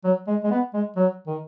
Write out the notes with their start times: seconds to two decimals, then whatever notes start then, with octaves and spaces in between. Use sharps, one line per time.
0.04 F#3
0.27 G#3
0.44 G#3
0.51 B3
0.74 G#3
0.96 F#3
1.27 D#3